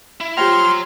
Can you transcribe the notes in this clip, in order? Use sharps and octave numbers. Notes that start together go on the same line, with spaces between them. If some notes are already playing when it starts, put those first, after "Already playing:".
E4
F4 G4 C5 C#5 G5 A#5 C6 F6